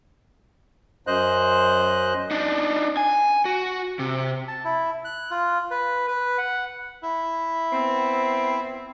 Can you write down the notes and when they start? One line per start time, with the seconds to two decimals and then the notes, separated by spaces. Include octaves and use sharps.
1.07 F#2 C5 D#5 F#6
2.31 D4 D#4
2.97 G#5
3.45 F#4
3.99 C3
4.48 A5
4.64 E4
5.05 F#6
5.31 F4
5.71 B4
6.08 B4
6.38 F#5
7.03 E4
7.72 B3 C4